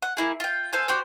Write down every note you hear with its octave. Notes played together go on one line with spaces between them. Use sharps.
F#5
A#3 E4 G#4
F4 G5
A4 C5 F5 G#5
F#4 G4 C5 D5